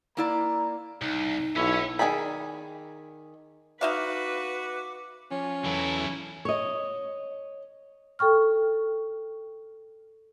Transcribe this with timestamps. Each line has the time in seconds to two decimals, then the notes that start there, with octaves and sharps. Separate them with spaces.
0.17 A#3 E4 D5 A#5
1.02 C2 D#4
1.56 B1 C#4 E4 C#5
1.99 D#3 C#4 G#4 D5 B5
3.81 D#4 F#4 B4 E5 F5 D6
5.31 F3 C#4
5.65 E2 E3 F#3 E4 A4
6.45 C#5 D#5
8.19 A4 G5 C#6 F6